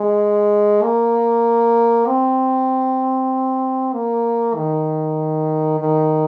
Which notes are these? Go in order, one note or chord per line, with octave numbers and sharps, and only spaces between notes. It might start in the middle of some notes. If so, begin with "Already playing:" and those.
Already playing: G#3
A#3
C4
A#3
D#3
D#3